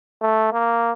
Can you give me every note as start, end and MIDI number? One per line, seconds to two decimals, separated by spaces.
0.21 0.49 57
0.52 0.92 58